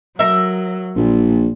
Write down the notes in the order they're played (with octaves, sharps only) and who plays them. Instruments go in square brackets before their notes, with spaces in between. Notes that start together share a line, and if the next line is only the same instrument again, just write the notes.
[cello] F#3 [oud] A#4 E5
[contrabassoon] A#1 [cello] A#2